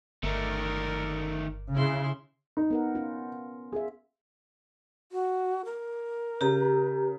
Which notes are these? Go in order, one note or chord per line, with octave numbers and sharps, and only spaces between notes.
G1 D#3 A3 A#4 D5
C#3 E4 C6
D#4
B3 A#4 F#5
C#4 F4
F4 G#4 E5
F#4
A#4
C#3 G4 A#5